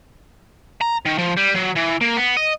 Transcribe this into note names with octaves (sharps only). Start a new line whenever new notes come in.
A#5
D#3
F3
G3
F#3
E3
A#3
B3
D#5